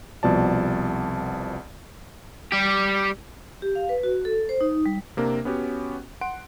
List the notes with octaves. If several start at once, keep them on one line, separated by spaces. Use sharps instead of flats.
C2 B2 F3 D5 A5
G3 G4
G4
F5
B4
F#4
A4
C5
D#4
G3
C3 A#3 D4 A#4
B3 C#4 F#4 G4
F#5 C6 D7